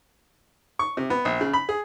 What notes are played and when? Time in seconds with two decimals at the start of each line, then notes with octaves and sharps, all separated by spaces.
0.79 C#6
0.97 C3
1.10 B3
1.25 A#1
1.41 C#3
1.53 B5
1.69 G#4